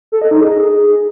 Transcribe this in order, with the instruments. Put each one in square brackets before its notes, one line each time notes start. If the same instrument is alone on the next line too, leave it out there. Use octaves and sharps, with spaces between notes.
[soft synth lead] A4
D#5
D#4
G#4